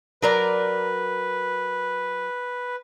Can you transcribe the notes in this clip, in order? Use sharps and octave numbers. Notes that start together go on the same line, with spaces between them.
F#3 A#4 B4 D5